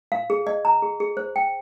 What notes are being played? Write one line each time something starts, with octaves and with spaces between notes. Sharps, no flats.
F5
G#4
D#5
A#5
G#4
G#4
C5
G5